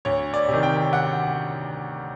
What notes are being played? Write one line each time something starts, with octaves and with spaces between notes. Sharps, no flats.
D2 C#5
D5
C3 D#3
G5
F#5